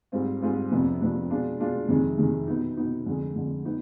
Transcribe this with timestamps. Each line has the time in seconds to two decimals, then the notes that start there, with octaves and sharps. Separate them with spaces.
0.12 G#2 G3 C4 F4
0.42 G#2 G3 C4 F4
0.71 F2 C3 F3 B3 D4
1.00 F2 C3 F3 B3 D4
1.30 B2 G#3 D4 F4
1.60 B2 G#3 D4 F4
1.89 F2 C3 D#3 G#3
2.18 F2 C3 D#3 G#3
2.48 B2 B3 D#4
2.77 B2 B3 D#4
3.06 F2 D3 G#3
3.36 F2 D3 G#3
3.65 B3 D#4